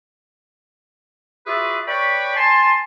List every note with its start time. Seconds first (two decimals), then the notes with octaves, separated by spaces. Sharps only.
1.47 F4 F#4 G#4 B4 D5 E5
1.87 B4 C#5 D5 G5 B5 C#6
2.36 G#5 A5 C6